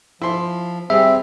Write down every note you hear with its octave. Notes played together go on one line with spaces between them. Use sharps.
F3 E4 C6
G3 C4 G#4 E5